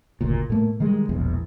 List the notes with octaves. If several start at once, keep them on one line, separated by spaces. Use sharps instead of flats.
F#1 D2 A#2
A2 A3 A#3
D#3 G3 G#3
E1 A#1 E2